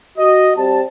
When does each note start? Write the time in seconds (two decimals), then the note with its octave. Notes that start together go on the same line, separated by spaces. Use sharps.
0.18 F#4 D#5
0.57 G3 C4 G4 A5